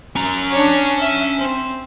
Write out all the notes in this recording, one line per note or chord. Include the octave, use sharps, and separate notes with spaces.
C#4 A#5
D4 C#5
E5
C4